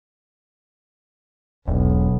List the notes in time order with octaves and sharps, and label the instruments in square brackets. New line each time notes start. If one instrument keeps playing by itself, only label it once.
[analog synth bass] E1 [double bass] B1